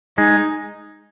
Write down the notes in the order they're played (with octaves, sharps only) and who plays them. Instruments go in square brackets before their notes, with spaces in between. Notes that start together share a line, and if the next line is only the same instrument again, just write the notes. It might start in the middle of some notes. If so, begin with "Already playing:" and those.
[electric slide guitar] G#3 [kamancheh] D#4